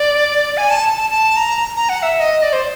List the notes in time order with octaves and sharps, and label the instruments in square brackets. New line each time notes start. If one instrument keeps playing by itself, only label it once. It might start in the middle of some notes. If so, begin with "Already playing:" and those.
Already playing: [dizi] D5
G#5
A5
A5
A5
A#5
A#5
F#5
E5
E5
D#5
D5
C5